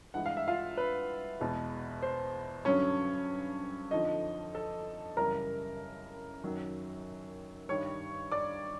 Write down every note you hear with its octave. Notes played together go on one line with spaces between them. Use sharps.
G2 E3 G#3 F#5
F5
E5
F4 F5
B4
E2 B2 G#3
C5
G2 D3 F#3 C#4 C#5
F2 D3 F3 D#4 D#5
A4 A5
F#2 C#3 E3 G3 A#4 A#5
F#2 D#3 F#3
G2 D#3 G3 C#5 C#6
D5 D6